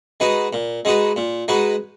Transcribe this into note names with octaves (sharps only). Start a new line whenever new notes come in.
G#3 D#4 F#4 B4
A#2
G#3 D#4 F#4 B4
A#2
G#3 D#4 F#4 B4